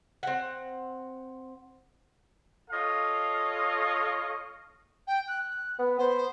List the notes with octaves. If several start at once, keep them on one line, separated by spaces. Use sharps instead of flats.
C4 F#5
F4 A4 C#5 D#5 F5
G5
F#6
B3
B3 C5